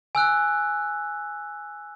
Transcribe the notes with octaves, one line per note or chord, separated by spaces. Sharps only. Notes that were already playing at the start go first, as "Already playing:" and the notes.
G#5 E6 F#6